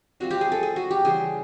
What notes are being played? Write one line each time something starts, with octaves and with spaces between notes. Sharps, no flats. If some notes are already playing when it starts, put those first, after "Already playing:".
G3 C4 F4 F#4
G4
G#4
A4
G#4
F#4
G4
C#3 E3 G3 G#4